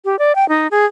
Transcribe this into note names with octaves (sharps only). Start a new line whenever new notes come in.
G4
D5
G5
D#4
G#4